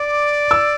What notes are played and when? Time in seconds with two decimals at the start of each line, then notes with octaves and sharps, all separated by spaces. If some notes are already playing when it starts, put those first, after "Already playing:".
Already playing: D5 D6
0.51 E6